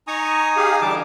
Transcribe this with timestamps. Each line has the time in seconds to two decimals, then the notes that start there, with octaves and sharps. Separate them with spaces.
0.08 D#4 G#5 A#5 C#6 D#6
0.57 G4 G#4 F5
0.82 D3 E3 G3 D4 A5 D6